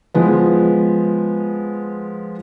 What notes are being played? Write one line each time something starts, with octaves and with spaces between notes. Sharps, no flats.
F3 G#3 B3